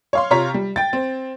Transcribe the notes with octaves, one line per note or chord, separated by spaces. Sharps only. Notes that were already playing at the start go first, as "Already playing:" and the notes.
C#5 F5 C6
C3 F4 C#5 A#5 B6
G3
G5 A6
C4